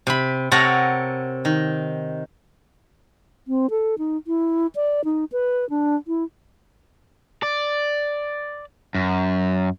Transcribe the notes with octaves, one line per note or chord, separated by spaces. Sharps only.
C3 B5
C3 A4 A#4 C#5 F#5 A#5
D#3
C4
A4
D#4
E4
D5
D#4
B4
D4
E4
D5
F#2